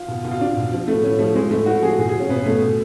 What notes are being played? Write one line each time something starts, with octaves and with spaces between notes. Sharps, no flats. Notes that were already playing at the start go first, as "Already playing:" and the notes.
Already playing: F4
B2
B2
F4
B2 D4
B2
F3
A2 A3
A2 C#4
F3 A3
F3 G#3
A2 A3
A2 F#4
F3 G#4
B2 G#4
G#4
B2
C#4
B2 B3
B2 A3
B2